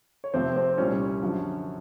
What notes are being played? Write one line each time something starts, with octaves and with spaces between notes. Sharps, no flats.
C#5
F2 C3 F3 A3 C4 C5
C4 C5
C5
C2 A#2 G3 C#4 C#5
F#2 D3 F3